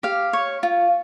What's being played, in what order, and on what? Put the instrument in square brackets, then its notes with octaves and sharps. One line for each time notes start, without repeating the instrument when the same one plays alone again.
[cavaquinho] G4 F5
C#5
F4